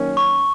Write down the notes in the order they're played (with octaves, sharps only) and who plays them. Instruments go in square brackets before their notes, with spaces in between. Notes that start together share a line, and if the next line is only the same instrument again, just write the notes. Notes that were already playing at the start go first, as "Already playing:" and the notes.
Already playing: [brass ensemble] F#2 D#3 A#3 C#4
[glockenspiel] C#6